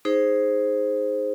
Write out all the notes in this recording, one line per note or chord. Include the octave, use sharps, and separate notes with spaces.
D#4 G#4 C5